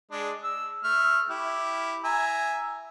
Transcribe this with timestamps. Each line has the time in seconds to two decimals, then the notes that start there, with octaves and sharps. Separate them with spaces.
0.11 G#3 D4
0.44 E6
0.84 A3 E5 F6
1.30 E4 G4
2.04 E5 G#5 A#5